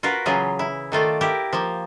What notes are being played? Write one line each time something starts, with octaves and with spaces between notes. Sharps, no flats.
F4 F#4 A#4 B4 F5
C#3 E3 F#3 F4 G#4
E4
D#3 A3 F4 D5
E4 G4 A#4
F3 A#3